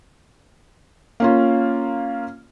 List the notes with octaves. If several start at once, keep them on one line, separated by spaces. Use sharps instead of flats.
A#3 C#4 F4